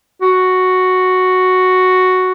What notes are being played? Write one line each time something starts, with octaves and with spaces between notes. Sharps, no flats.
F#4